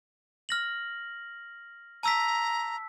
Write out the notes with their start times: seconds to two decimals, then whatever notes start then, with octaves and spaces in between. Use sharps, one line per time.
0.49 F6 A#6 F#7
2.03 A5 A#5 E6 B6